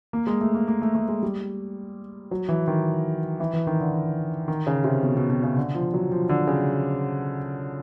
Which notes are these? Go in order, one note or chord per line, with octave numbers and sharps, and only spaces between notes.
A#3
G#3
A3
A#3
A#3
A3
A3
G#3
G3
F#3
E3
D#3
E3
E3
D#3
D3
D#3
C#3
C3
B2
B2
B2
C#3
D3
F3
F#3
F3
D3
C#3